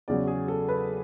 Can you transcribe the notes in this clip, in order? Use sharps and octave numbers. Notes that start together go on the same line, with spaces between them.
E2 C#3 F#3 D5
G#4
A4
B4